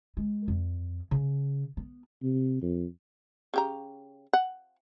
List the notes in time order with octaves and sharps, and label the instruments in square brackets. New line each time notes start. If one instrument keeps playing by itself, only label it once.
[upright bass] G#3
F2
C#3
B3
[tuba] C3
F2
[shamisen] C#3 G4 A#5
F#5